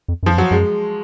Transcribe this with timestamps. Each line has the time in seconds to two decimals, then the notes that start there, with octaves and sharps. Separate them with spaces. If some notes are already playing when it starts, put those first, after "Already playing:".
0.08 F2
0.23 F#2
0.26 F2 F3
0.37 F#2 F#3
0.51 F#2 G#3